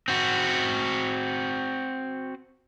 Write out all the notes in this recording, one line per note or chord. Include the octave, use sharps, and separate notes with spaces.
C4 F#4